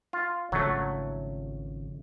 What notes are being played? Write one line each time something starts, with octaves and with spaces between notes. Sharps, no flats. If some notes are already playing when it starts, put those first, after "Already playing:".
F4
G#1 C#3 F3 F#3 A3